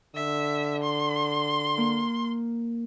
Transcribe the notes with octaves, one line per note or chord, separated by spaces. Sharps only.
D3 E5
C6
A#3